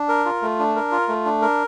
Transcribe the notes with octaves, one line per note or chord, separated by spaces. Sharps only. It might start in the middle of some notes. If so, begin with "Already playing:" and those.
Already playing: D4
A#4
F4
A3
D4
A#4
F4
A3
D4
A#4